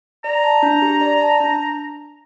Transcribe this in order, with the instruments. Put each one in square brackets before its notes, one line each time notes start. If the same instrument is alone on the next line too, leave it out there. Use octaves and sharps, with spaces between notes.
[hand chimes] D5 [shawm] A#5
[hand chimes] A5
D4
G4
D5
A5
D4